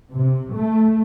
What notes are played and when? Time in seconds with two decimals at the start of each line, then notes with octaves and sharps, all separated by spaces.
0.12 C3
0.55 A3